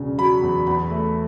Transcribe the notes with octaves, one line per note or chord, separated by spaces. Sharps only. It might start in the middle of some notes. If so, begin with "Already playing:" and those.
Already playing: E1 C#3
F#3 B5
E2
E2 B5
A3